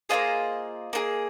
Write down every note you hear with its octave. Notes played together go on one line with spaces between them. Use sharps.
A#3 D4 F4 G#4 C5 D#5
A#3 F4 G#4